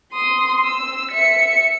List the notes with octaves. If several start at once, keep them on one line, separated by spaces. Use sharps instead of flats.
C6 D#6
E6
E5 C#7